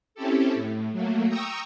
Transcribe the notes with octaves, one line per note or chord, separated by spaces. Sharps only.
C4 C#4 E4 G4 A4
A2
F#3 A3 A#3
G5 A#5 C#6 D#6 E6